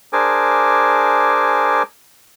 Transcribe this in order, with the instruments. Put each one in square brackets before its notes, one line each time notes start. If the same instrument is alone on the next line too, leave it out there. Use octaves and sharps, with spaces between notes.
[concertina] D4 G#4 A#4 C5 G#5 D6